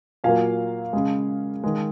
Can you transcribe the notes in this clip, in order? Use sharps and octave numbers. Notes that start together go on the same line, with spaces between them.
A#2 F#3 A#3 F5 G#5
C#3 G#3
D#3 G#3